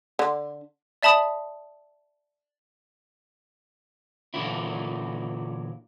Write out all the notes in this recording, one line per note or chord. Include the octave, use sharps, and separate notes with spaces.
D3
D5 E5 A5 B5 D#6
A#2 D3 E3 F#3 E4